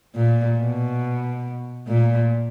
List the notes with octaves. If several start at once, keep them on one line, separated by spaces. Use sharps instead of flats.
A#2
B2
A#2